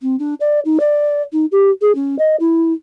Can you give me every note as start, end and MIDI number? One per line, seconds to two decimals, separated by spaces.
0.01 0.15 60
0.19 0.34 62
0.40 0.60 74
0.65 0.77 63
0.80 1.22 74
1.32 1.45 63
1.52 1.70 67
1.81 1.94 68
1.95 2.16 61
2.18 2.36 75
2.39 2.72 64